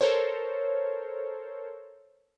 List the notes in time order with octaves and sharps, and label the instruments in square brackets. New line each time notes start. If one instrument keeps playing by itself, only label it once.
[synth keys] A4 A#4 C5 C#5